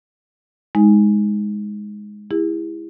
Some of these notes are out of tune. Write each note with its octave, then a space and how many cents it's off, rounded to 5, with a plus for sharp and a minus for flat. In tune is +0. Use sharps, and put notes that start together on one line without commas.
G#3 +0 D#4 +20
E4 +0 G#4 -40